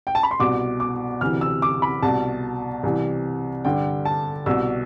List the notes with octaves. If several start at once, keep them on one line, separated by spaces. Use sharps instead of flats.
G5
A5
B5
C6
C2 B2 D6
D6
D2 C3 E3 F6
E6
D6
B5
C2 B2 A5
C2 C3 E3
G2 D3 G5
A5
C2 B2 E6